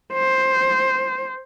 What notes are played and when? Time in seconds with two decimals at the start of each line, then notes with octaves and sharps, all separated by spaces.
0.13 C5